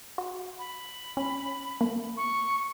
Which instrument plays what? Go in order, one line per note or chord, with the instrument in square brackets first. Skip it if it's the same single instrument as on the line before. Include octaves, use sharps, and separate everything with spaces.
[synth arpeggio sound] F#4
[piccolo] B5
[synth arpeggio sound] C#4
A#3
[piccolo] C#6